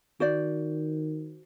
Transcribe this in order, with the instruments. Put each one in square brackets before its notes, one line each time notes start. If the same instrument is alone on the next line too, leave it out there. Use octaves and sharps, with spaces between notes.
[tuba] D#3 [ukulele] F#4 C5 D5